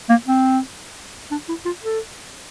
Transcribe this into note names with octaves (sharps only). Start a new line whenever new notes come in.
A#3
C4
D4
E4
F4
A4